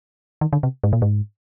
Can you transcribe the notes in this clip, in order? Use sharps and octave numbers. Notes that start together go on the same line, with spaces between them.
D#3
D3
C3
G#2
A#2
G#2